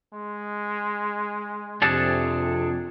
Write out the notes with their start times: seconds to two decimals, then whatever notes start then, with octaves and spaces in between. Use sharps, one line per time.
0.14 G#3
1.82 F2 C3 D4 G#4 A4